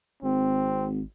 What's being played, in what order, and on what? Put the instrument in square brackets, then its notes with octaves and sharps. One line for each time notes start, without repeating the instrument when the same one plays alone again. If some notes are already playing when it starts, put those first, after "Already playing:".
[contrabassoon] G#1 [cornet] C4